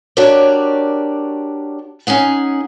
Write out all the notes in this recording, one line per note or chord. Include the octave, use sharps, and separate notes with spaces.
D4 F#4 G4 A#4 C#5 D5
C#4 D#4 G#4 F#5